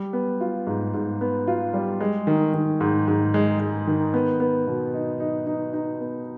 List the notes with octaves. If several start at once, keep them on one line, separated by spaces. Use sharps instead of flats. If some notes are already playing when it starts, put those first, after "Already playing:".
Already playing: G3
B3
F4
G#2
G#2
B3
F4
G3
G#3
D#3
D#3
G#2
G#2
G#3
G#3
D#3
B3
B3
B2
D#4
D#4
D#4
D#4
B3